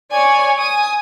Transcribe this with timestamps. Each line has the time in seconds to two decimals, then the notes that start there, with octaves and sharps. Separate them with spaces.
0.12 C#5 D5 G#5
0.56 G#5 D#6